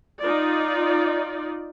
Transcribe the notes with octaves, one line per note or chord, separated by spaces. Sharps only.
D#4 F4 D5